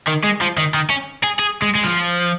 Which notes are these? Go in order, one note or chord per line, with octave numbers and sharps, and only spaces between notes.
D#3
G#3
F3
D#3
D#3
C#4
G#4
G#4
G#3
G#3
F3